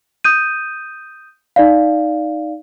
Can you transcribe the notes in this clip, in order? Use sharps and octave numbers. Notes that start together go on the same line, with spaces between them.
D#6 G6 D#7
D#4 D5 F5